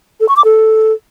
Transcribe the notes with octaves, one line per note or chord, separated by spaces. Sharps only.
A4
C#6
D6
A4